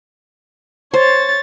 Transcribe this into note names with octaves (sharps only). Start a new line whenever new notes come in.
C5 C#5 A6